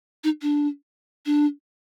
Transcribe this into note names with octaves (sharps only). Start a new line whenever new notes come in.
D#4
D4
D4